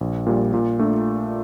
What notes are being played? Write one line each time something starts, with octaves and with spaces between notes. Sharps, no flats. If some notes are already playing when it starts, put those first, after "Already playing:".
A#1
A#2 G3
A#2
A3 D4 F4